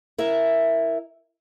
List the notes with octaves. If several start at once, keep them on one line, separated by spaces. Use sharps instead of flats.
E4 A#4 E5